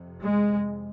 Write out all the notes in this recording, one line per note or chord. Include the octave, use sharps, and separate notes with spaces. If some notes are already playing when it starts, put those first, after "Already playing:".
Already playing: F2 C3
G#3